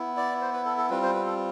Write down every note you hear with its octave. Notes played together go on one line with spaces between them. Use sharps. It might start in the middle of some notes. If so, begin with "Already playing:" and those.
Already playing: B3 E4
D5
C5
B4
A4
A4
G3 C4 F4 B4
C5
B4
A4